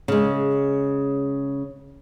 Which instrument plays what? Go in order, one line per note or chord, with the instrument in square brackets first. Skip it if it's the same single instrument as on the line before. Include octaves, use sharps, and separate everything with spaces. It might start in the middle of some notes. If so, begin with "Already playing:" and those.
[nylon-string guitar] C#3 G#3